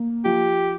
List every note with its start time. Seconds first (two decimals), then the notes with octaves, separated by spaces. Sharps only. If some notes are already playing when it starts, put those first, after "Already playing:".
Already playing: A#3
0.25 F3 G4